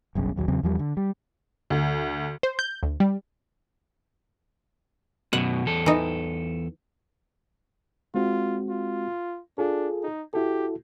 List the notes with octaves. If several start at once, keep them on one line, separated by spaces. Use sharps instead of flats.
F#1 B1 G2 C#3
A#1 D#2 F#3
E2 C#3 F#3 C4
E2 F3 G3
D3
G3
D2
C5
G6
D2
G3
F#2 B2 F#5
E2 A4
E3 D#4
G#3 C4 F4 F#4
F4
D4 F4 G#4 A4
D#4
E4 F#4 G4 A4